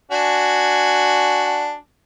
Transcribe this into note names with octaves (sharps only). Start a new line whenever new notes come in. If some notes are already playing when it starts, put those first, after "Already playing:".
D4 F#4 G#5